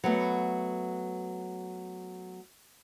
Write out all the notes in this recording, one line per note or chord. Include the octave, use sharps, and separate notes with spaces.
F#3 A3 B3